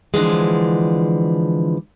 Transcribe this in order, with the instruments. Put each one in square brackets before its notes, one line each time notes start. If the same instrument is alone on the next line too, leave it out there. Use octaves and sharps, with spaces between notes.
[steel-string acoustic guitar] D3 E3 F3 G#3